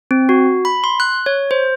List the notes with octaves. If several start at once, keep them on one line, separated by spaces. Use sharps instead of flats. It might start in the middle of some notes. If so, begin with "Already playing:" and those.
C4
F#4
B5
C6
F#6
C#5
C5